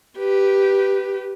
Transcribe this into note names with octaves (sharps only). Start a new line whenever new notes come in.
G4 B4